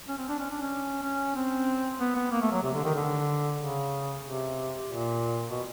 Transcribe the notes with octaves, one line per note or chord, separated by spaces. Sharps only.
C#4
C4
D4
C#4
D4
C#4
C#4
C4
B3
B3
A#3
A3
F#3
C3
D3
D#3
D3
C#3
C3
A#2
B2